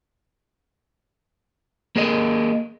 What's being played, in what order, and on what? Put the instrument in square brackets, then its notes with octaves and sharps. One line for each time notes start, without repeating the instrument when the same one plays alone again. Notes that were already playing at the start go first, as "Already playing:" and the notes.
[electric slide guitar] A#3 G#4 A#4 D#5